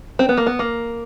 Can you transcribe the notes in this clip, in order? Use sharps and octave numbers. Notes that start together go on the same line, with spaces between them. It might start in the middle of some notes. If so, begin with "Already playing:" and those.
C4
B3
A#3
B3
A#3